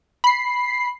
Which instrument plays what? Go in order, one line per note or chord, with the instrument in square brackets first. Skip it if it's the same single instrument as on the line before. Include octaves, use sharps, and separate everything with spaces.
[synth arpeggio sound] B5 C7